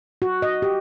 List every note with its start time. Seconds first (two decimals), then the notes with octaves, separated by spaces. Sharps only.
0.22 F#4
0.42 D#5
0.62 G4